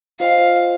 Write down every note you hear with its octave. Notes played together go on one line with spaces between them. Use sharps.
F4 C5 D#5 F5 G5